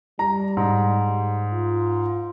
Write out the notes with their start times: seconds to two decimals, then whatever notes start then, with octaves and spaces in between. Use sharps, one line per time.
0.19 G3 A#5
0.57 G#2
1.53 F4